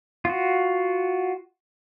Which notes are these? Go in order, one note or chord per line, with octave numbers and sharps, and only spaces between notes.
F4 F#4